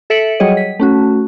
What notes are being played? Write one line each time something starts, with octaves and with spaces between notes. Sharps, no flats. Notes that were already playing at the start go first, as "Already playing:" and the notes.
A4 E5 B6 C#7 D7 F#7
F#3 G3 G#4 C#5 D#5
B6
A3 C#4 F#4